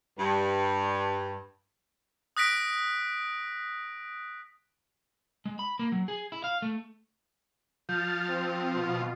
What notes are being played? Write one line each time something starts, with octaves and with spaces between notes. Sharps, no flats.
G2
D#6 F#6 A#6 B6 D7
G#3
B5
A#3
F#3
G#4
E4
F5
A3
F3 F6 G6 A6
C4
B2 F4